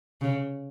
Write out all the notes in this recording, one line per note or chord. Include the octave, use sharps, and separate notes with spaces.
C#3